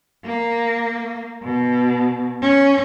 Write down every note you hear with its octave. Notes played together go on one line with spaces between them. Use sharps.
A#3
B2
C#4